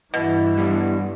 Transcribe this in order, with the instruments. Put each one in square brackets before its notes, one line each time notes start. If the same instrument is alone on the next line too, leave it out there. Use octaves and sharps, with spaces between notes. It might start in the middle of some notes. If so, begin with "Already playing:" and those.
[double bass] G2 E3 [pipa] B2 [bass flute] E4
[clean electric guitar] G3 B3 D4